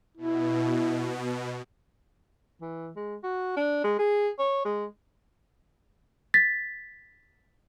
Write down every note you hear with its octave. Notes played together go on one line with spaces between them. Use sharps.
B2 E4
E3
G#3
F#4
D4
G#3
G#4
C#5
G#3
A6 B6